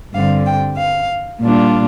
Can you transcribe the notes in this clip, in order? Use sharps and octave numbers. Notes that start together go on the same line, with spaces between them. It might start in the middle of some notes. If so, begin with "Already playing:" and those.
G2 D3 G3 C4 F5
G5
F5
A#2 G3 D4 F4